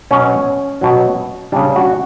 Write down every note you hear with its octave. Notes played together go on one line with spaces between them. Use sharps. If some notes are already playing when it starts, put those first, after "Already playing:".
B2 F#3 C#4
B2 F#3
C#3 G3 D4
F#4